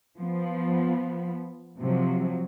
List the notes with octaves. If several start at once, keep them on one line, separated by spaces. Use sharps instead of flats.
F3 B3
C3 F3 F#3